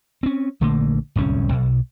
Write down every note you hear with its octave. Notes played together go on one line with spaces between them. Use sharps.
C4 C#4
A#1 D3 A3 A#3
D1 C2 F2 C#4
B1